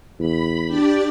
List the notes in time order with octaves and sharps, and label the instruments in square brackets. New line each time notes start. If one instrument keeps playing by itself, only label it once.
[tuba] E2 [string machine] B5
[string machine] D4 G4 D5